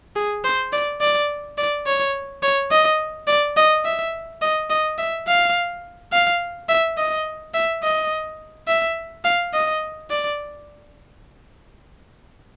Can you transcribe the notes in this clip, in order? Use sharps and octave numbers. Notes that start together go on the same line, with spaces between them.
G#4
C5
D5
D5
D5
C#5
C#5
D#5
D5
D#5
E5
D#5
D#5
E5
F5
F5
E5
D#5
E5
D#5
E5
F5
D#5
D5